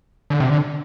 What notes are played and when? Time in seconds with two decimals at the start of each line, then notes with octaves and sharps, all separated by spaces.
0.30 D3
0.40 C3
0.50 D3